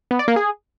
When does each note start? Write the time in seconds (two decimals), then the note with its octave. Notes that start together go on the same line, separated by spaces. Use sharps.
0.11 B3
0.19 D5
0.28 A#3
0.36 G#4